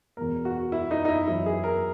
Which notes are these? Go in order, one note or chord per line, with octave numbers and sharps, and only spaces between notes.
E2 B2 A#4
F#4
E4
D#4
D#4
E4
F#2 E3 E4
G#4
A#4